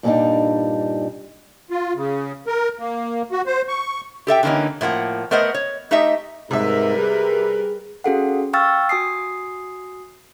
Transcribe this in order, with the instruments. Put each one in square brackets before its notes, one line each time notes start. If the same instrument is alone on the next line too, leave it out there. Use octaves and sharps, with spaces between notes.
[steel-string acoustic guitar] G2 A#2 G3 G#3 D4 D#4
[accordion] F4
C#3
A#4
A#3
F#4
C5
C#6
[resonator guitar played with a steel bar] G4 A4 E5 G5
D3 E3 A#3 C#4 D#4
A2 F3 A#3 F#5
A3 B3 A#4 C5 D#5 F#5
C#5
A3 D#4 G4 D#5 E5
[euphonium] G#2 [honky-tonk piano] C3 E5 [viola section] G3 A#4 B4
[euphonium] G#4
[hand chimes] C#4 F#4 G#4 A4 F5 F#5
F5 G5 C#6 E6 F6 A6
F#4 G#5 D#6 C7